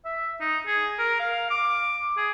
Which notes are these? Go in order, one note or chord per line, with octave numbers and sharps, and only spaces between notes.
E5
D#4
G#4
A#4
F5
D6
G#4